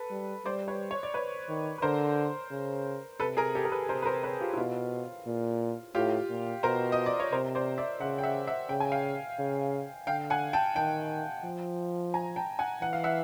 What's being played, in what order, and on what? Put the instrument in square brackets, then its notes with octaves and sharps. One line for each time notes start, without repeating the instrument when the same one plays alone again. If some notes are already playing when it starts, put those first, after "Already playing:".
Already playing: [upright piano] A4 B4
[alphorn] G3
[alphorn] G3 [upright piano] C5 D5
[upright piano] B4 C#5
C#5
D5
B4 C#5
[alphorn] D#3
[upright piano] B4
[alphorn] D3 [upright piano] A#4 C5
[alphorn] C#3
[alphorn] C3 [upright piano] A4 B4
[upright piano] G#4 A#4
G4 A4
A#4
A4 B4
[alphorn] C3 [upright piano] A#4 C5
[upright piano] B4
A#4 C5
B4 C#5
F4 G4
E4
[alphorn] B2 [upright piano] F4
[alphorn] A#2
[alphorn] A2 [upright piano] F4 G4
[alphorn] A#2
[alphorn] B2 [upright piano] A#4 C5
[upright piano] D#5
D5
C#5
[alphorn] C3 [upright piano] A#4 C5
[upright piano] C5 D5
D5 E5
[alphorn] C#3 [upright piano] E5 F#5
[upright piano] G5
E5 F#5
E5 F#5
[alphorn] C#3 [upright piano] G5
[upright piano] G#5
F5 G5
[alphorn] C#3
[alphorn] D3 [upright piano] F5 G5
[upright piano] F#5 G#5
G5 A5
[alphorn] D#3 [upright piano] G5 A5
[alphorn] F3
[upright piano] G#5 A#5
G5 A5
F#5 G#5
[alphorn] E3 [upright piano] F#5
[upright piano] F5
E5 F#5